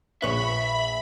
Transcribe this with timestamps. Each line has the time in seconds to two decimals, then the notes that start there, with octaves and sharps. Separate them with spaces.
0.22 A#1 B4 C#5 E5 B5 F#7